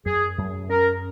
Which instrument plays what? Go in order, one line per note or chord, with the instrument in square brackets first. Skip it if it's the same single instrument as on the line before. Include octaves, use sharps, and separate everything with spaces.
[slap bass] F#2 [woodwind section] G#4
[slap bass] F#2
[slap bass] C#4 [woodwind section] A#4